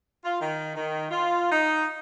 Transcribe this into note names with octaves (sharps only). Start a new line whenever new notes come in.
F4
D#3
D#3
F4
D#4